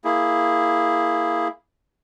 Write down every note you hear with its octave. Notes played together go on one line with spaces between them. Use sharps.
A#3 E4 G#4